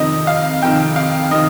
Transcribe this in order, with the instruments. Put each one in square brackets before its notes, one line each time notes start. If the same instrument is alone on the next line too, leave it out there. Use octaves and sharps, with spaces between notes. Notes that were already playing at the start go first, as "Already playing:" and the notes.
Already playing: [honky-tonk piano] F2 C3 D#3 D#5
F5
F2 C3 D#3 G5
F5
C3 D#3 D#5